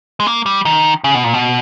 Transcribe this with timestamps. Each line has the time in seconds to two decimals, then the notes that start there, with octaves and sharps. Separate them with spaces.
0.20 G#3
0.27 A#3
0.46 G3
0.65 D#3
1.04 C#3
1.15 B2
1.24 A#2
1.34 B2